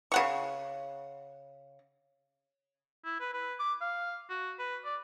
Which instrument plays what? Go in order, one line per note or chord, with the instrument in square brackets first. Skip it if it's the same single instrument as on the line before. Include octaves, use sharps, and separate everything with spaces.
[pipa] C#3 F#5 C#6
[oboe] E4
B4
B4
D6
F5
F#4
B4
D5